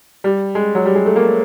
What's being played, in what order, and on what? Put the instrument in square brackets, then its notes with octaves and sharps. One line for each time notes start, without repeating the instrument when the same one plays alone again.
[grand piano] G3
G#3
F#3
G3
G#3
A3
A#3